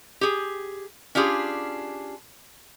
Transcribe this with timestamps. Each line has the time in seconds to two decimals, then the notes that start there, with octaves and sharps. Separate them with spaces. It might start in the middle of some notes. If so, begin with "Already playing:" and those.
0.21 G4 G#4
1.15 C#4 D4 F4 G4 G#4